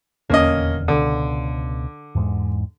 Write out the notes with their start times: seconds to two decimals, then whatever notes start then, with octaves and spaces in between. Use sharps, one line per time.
0.30 D#1 E2 D3 A#3 C#4 D#5
0.88 C#2 B2 D3
2.15 E2 G#2 G#3